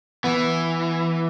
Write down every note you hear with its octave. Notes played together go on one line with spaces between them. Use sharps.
E3 B3